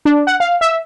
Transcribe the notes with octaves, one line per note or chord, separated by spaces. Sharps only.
D4
F#5
F5
E5